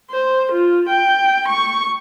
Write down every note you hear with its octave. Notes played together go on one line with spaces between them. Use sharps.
C5
F4
G5
C#6